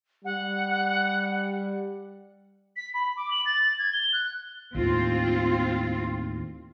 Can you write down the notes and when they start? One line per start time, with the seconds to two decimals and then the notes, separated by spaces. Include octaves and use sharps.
0.24 G3 F#5
2.77 B6
2.94 B5
3.17 D6
3.31 F#7
3.46 A6
3.79 G#6
3.93 G7
4.13 F#6
4.75 D#2 A2 C4 F4